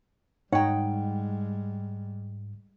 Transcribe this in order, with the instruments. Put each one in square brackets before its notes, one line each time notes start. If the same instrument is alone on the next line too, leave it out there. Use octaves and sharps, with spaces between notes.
[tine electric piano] G#2 [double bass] G3 G#3 [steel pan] D#4 C#5 [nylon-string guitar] F#5 G5